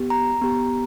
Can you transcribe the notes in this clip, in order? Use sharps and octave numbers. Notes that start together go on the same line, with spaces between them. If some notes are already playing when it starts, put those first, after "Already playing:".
Already playing: B3 G4
A#5
B3 G4